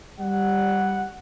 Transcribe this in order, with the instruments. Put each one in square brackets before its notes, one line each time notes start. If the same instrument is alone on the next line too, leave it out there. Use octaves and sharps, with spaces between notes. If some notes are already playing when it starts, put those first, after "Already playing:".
[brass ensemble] G3 [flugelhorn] F#5